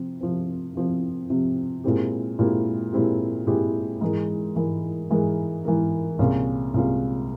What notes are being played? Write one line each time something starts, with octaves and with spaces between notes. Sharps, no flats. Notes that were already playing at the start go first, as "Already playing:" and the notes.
Already playing: C3 F3 C4
C3 F3 C4
C3 F3 C4
C3 F3 C4
A#2 G#3 C4 E4 G4
A#2 G#3 C4 E4 G4
A#2 G#3 C4 E4 G4
A#2 G#3 C4 E4 G4
G#2 E3 G#3 E4 A#4
G#2 E3 G#3 E4 A#4
G#2 E3 G#3 E4 A#4
G#2 E3 G#3 E4 A#4
C2 A#2 G#3 C#4 F4
C2 A#2 G#3 C#4 F4